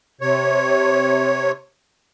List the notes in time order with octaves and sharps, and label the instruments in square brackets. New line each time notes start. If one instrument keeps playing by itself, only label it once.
[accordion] C3 C#5